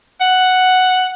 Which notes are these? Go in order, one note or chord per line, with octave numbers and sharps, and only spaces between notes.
F#5